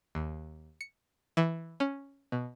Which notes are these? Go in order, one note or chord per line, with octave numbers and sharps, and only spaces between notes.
D#2
C#7
E3
C#4
B2